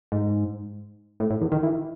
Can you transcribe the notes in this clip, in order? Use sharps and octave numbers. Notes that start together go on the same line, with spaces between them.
G#2
A2
A2
E2
D#3
E3